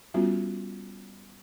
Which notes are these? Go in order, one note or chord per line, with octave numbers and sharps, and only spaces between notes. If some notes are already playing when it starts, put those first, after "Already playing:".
G3 B3 C#4 F4 F#4